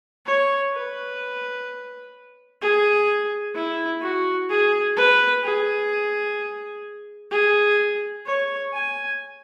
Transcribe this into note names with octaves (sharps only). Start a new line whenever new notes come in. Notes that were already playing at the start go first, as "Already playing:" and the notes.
C#5
B4
G#4
E4
F#4
G#4
B4
G#4
G#4
C#5
G#5